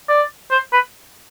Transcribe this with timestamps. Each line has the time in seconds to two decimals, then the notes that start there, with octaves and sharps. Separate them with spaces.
0.09 D5
0.51 C5
0.73 B4